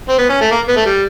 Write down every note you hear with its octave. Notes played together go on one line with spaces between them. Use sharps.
C4
B3
C#4
A3
A#3
B3
A3
G3